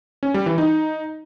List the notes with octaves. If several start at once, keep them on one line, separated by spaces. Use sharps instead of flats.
C#4
G3
E3
D#4